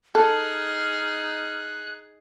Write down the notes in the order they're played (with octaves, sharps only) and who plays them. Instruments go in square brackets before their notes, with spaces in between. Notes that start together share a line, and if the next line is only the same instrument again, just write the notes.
[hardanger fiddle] D#4 G#4 [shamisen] A4 [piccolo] F6 [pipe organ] F#6